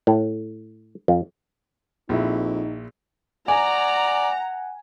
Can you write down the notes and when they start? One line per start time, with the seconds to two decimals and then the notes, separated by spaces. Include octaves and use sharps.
0.07 A2
1.08 F2
2.09 A#1 F2 D#4 E4
3.48 D5 F#5 G#5 A#5